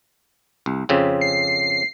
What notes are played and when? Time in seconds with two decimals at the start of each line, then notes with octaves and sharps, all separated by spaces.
0.66 C2
0.89 F2 C#3 C4
1.21 C7